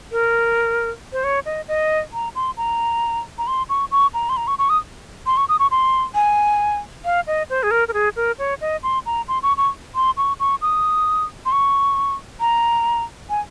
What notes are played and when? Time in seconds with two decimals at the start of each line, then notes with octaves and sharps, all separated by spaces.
0.12 A#4
1.13 C5
1.24 C#5
1.46 D#5
1.68 D#5
2.13 A#5
2.35 C6
2.57 A#5
3.38 A#5
3.47 C6
3.69 C#6
3.91 C#6
4.14 A#5
4.29 C6
4.37 A#5
4.47 C#6
4.59 C#6
4.70 D#6
5.26 C6
5.37 C#6
5.49 D#6
5.59 C#6
5.71 C6
6.15 G#5
7.05 F5
7.27 D#5
7.50 C5
7.63 G#4
7.71 A#4
7.88 A#4
7.94 G#4
8.16 A#4
8.39 C#5
8.61 D#5
8.83 C6
9.06 A#5
9.28 C6
9.43 C#6
9.57 C#6
9.95 C6
10.17 C#6
10.40 C#6
10.62 D#6
11.46 C6
11.52 C#6
12.40 A#5
13.30 G#5